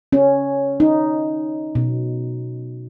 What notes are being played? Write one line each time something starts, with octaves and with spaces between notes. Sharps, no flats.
C#4
D#4
B2